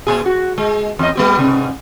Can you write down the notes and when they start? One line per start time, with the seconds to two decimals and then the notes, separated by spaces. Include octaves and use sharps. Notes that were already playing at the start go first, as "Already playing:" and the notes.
0.07 A#2 G#4
0.26 F#4
0.58 G#3
0.99 E2 D#5
1.15 G3 B3 G4
1.39 G#2 C3